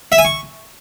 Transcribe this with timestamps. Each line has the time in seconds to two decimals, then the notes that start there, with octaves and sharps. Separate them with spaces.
0.12 E5
0.18 G#5
0.25 C#6